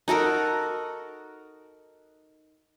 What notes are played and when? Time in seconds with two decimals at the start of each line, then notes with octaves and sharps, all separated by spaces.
0.08 D#4 F#4 A4 A#4